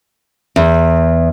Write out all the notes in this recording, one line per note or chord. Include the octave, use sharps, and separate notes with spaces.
E2